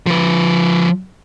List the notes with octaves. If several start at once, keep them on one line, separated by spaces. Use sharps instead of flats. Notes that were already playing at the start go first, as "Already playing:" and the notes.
F3 B4